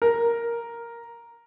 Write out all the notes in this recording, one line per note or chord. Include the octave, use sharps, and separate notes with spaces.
A#4